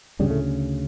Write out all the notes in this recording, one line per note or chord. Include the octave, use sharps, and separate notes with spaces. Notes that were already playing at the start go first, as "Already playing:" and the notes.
D2 G2 C#3 G3
A2 A3